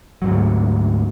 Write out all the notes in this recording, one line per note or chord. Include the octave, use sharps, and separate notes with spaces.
D2 G#2 F#3